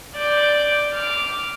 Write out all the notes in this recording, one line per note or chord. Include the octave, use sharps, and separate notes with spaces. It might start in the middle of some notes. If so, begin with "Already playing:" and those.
D5 G6
D6 F6